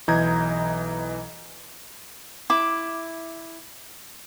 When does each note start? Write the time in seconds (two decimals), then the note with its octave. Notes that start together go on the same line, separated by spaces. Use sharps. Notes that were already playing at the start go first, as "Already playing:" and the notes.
0.08 B1 E3 D#5 A#5 G6 G#6
2.50 E4 D6